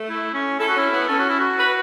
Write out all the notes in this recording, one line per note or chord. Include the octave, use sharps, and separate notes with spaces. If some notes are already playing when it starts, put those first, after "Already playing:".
Already playing: A3
E4
C#4
E4 A4
F#4
C#4 E4
B3
C#4 A4
F#4
E4
F#4
B4